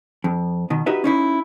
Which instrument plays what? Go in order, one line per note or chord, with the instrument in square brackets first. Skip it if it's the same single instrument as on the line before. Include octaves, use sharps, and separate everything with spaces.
[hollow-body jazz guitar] F2
B2 D#3
D#4 F#4 G4 B4 E5
C#4 D#4 E4